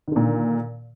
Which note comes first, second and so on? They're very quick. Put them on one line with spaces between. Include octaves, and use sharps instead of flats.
D#3 D3 A#2